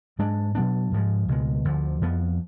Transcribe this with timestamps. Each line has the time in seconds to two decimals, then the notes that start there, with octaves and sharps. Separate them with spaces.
0.19 G#2 G#3 D4
0.55 B2 F#3 B3 D4
0.92 G#2 F3 G#3
1.28 C#2 B2 G#3
1.65 D2 D3 F3
2.01 F2 F3 B3